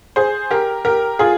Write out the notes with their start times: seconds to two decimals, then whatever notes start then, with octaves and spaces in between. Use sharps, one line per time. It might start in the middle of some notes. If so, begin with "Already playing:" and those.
0.16 G#4 C5
0.51 G4 A#4
0.85 G4 A#4
1.19 F4 G#4